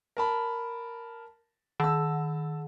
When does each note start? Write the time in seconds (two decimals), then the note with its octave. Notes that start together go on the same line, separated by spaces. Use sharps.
0.17 A#4 A5 B5
1.80 D#3 A5 E6